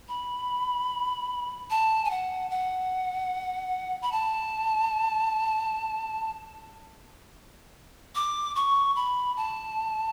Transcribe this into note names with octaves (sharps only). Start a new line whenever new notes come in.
B5
A5
G#5
F#5
F#5
B5
A5
D6
C#6
B5
A5